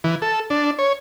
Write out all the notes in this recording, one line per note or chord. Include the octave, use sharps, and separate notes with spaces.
E3
A4
D4
C#5